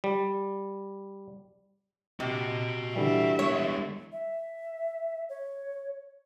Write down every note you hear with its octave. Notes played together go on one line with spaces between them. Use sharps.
G3
C3 F#4 D#5
D3 E3 G3 E5
G#3 B3 C#5
E5
C#5